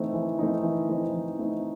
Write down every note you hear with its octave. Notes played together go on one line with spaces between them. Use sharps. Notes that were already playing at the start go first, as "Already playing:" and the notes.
Already playing: E3 A3 C4 D#4
E3
A3 C4 D#4
E3
A3 C4 D#4
E3
A3 C4 D#4